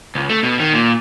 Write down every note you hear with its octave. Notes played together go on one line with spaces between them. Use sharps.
C#2
A3
B2
D#3
A#2